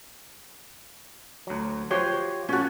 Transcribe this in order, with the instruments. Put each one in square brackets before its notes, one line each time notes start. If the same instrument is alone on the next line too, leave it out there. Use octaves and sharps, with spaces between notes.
[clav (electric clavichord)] D2 F#3
[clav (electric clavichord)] F3 G4 [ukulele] F#4 C5 C#5
[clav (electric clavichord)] A#2 A5 [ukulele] C#4 F#4